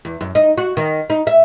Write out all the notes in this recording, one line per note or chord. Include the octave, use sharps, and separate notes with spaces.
E2
F#2
D#4
F#4
D#3
D#4
E5